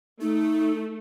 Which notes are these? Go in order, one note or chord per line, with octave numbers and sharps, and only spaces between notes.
A3 D#4